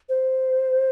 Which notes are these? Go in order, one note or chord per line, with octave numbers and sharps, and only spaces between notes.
C5